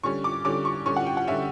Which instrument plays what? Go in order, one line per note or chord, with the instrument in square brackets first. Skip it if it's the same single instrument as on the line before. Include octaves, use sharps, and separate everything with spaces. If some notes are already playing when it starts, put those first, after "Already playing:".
[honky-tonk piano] D3 G3 C#4 C#6
D6
D3 G3 C#4 D6
C#6
D3 G3 C#4 C#6
F#5
G5
F#5
D3 G3 C#4 E5